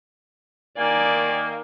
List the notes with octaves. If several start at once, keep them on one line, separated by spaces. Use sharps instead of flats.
D#3 A#3 D5 G#5